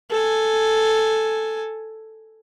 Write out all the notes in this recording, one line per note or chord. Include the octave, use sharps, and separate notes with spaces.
A4 G#5